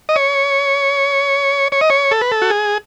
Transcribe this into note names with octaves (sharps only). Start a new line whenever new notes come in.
D#5
C#5
C#5
D#5
C#5
A4
B4
A4
F#4
G#4